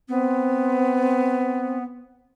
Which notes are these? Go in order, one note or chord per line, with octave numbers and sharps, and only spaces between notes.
B3 C4